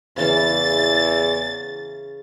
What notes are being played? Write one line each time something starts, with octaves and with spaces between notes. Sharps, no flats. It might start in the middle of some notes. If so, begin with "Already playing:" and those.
E2 C#3 E3 C#4 A6